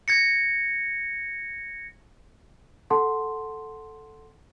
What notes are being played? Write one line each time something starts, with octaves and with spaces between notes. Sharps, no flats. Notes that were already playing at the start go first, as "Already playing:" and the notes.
G#6 A#6 C#7
A4 F#5 A5 C6